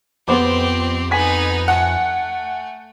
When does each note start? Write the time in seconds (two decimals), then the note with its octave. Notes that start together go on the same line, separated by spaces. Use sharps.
0.28 F2 B3 C4 G4 C5 D6
1.11 B3 D#4 G#5 B6
1.68 A3 F#5